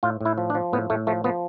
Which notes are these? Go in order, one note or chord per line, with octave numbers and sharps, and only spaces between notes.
A2 F4
A2 E4
F3
D4
F3
A2 B3
A2 A3
F3 A3
F3 B3